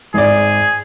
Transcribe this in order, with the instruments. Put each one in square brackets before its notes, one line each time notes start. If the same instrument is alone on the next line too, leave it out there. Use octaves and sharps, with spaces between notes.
[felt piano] G#1 D5 [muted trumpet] G#4